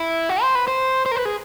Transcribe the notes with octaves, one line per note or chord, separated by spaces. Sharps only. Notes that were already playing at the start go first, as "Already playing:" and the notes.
Already playing: E4
F#4
C5
B4
C5
C5
A#4
B4
G#4